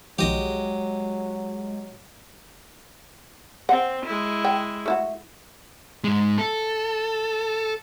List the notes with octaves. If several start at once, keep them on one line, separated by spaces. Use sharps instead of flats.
B1 D#3 F3 F#3 G#3 G4 D#5
C4 F#5
G#3 E4
G5
A3 E4 F#4
G#2 G#3
A4